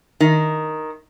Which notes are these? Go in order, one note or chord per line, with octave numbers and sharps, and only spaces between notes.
D#3